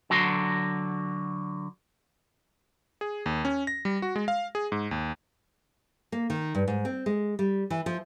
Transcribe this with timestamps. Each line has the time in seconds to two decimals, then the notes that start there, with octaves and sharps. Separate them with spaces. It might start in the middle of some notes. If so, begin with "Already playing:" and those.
0.10 D3 F#3 F#4 C6
3.01 G#4
3.26 D#2
3.45 C#4
3.67 A#6
3.85 G3
4.02 F#4
4.16 G#3
4.28 F5
4.55 G#4
4.72 G#2
4.91 D#2
6.12 A#3
6.30 D#3
6.55 G2
6.68 G#2
6.85 C4
7.06 G#3
7.39 G3
7.70 E3
7.86 F3